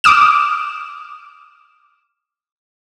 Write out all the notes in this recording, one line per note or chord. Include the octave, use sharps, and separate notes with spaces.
D6 D#6 F6 E7